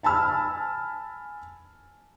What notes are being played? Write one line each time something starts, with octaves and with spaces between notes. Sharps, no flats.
G#5 A5 B5 E6 F6